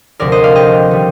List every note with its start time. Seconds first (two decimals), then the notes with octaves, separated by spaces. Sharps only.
0.20 D2 C3 F3 A#4 D5
0.32 C5 D#5
0.44 D5 F5
0.55 D#5 G5
0.91 D#3 G3